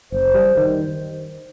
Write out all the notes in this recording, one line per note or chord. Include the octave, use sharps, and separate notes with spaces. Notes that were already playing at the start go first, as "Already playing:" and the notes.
F#1 C5
G3
D#3